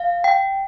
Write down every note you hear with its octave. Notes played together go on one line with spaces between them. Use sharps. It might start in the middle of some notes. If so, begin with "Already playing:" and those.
Already playing: F5
G5